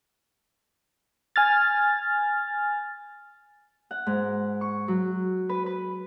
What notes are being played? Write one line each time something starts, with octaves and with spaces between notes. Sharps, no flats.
G#5 F6 A6
F#5
G#2
C#6
F#3
B4
B4